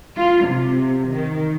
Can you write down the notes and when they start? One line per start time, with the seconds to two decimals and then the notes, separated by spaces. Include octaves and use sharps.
0.17 F4
0.46 C3
1.10 D#3